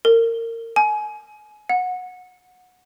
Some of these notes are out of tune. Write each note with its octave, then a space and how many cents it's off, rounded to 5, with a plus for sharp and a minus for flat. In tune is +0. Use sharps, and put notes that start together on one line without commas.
A#4 -25
G#5 +30
F#5 -20